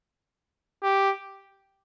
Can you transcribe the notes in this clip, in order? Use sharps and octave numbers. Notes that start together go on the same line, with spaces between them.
G4